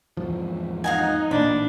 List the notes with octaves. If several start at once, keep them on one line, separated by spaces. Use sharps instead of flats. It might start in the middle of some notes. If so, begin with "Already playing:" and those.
E2 G#2 F3
D#4 F5 F#5 G#5
A1 A#2 D4 B5